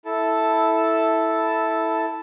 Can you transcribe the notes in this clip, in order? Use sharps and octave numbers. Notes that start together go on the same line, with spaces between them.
E4 A4 A5